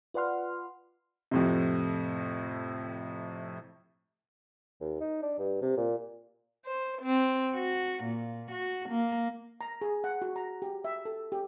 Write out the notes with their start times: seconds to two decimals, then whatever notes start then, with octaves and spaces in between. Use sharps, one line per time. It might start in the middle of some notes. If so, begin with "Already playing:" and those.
0.14 F4 B4 D5 F#5 C6 F6
1.31 F2 A2 C3
4.81 D#2
5.01 D#4
5.22 D4
5.39 G2
5.62 C3
5.77 A#2
6.66 C5
7.02 C4
7.54 F#4
8.03 A#2
8.51 F#4
8.89 A#3
9.61 A#5
9.81 G#4
10.04 F#5
10.22 F#4
10.36 A#5
10.62 G4
10.84 E5
11.05 A4
11.32 G4